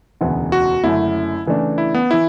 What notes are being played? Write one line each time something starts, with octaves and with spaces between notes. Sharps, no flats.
E1 D2 C#3 E3 B3
F#4
F#1 F#2 D3 A3 C#4 E4
C#3 E3 A3 D4
E4
B3
E3 E4